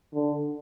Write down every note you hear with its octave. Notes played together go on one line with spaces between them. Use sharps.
D3